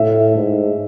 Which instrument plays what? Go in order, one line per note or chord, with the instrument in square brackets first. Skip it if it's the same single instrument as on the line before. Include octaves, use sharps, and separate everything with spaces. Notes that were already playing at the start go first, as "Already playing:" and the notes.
Already playing: [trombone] A2 [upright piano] E5
[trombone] G#2